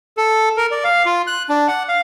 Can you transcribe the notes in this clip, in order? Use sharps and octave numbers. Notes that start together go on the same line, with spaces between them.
A4
A#4
D5
F5
F4
F#6
D4
F#5
F5